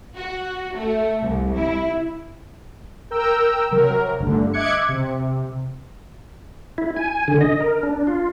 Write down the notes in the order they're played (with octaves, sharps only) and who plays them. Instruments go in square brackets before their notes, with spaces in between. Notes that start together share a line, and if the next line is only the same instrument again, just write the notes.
[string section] F#4
A3
C2
E4
[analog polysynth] A#4 G5 A#5 E6
C3 F#3 A#4
G1 G2 D3 A3
D#5 E5 D6 F#6 G#6 C#7
C3
[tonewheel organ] E4
G#5
D3
D#5
A#4
D4
F4